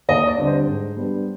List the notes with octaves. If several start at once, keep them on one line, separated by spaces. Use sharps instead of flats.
D#2 D#5
D5
D3 G3 C4
C5
G#2
G3 B3 D4